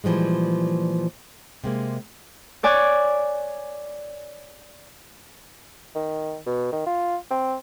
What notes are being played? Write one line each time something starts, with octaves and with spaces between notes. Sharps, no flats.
A#2 E3 F3 G3 G#3
C3 G#3 A#3
C#5 D5 G#5 D6 F#6
D#3
B2
D#3
F4
C4